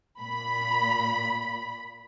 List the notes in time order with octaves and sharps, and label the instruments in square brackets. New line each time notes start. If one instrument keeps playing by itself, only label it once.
[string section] A#2 B5